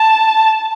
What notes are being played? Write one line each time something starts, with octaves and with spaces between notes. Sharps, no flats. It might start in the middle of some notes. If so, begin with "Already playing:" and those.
Already playing: A5